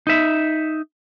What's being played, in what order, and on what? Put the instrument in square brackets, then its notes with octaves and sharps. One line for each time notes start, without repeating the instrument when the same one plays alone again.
[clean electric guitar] D#4 E5